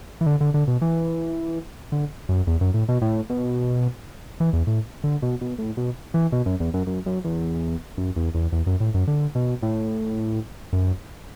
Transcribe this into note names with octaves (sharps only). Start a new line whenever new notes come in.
E3
D3
D3
D3
B2
E3
D3
F#2
E2
F#2
A2
B2
A2
B2
E3
E2
A2
D3
B2
B2
A2
B2
E3
B2
F#2
E2
F#2
F#2
F#2
E2
F#2
E2
E2
E2
F#2
A2
F#2
D3
B2
A2
F#2